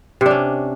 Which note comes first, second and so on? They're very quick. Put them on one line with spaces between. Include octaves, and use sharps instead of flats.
C3 D4 C#4